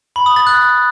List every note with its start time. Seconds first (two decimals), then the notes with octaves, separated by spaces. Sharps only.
0.16 B5
0.26 D#6
0.36 A6
0.47 F#6